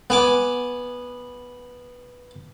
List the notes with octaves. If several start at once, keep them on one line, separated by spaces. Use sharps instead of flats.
B3 G#5 D6